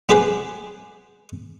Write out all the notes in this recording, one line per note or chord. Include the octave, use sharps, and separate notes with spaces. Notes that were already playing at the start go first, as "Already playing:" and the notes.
B3 C4 G4 G#4 B4 C5